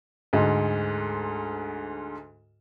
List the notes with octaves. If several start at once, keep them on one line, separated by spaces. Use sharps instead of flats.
D2 G#2